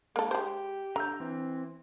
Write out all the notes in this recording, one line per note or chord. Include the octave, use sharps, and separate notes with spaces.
G#3 A#3 A4
G#3 G4 C5
D3 A#5 E6 G6
E3 C4